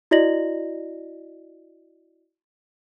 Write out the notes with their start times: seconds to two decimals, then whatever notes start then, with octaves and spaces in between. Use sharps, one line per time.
0.11 E4 F#4 D5 D#5 A#6 F#7